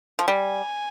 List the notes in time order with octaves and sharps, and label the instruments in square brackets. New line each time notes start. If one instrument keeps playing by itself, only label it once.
[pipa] F3
[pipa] G3 [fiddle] G#5